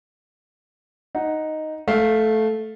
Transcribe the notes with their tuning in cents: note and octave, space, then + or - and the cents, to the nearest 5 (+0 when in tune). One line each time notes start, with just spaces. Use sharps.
D#4 +0 F#5 +0
A3 -10 F5 +0